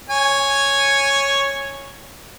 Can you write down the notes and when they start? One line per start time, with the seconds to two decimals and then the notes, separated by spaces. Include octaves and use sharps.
0.10 C#5 G#5